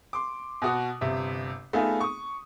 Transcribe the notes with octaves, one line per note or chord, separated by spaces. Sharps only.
C6 D6
B2 F#4 D#6
G1 C3 E5
A3 B3 D#4 F4 G#4
C#6 D#6